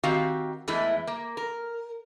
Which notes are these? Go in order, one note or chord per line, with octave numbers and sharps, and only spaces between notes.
D#3 C4 F#4 G4 F5
E2 E3 G#3 A3 E4
A#3
A#4